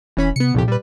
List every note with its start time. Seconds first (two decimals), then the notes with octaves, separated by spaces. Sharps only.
0.17 E1 E3 C#4 B5
0.36 C3 B3 C#7
0.54 C2 F2 A#2 G4
0.68 G3 B4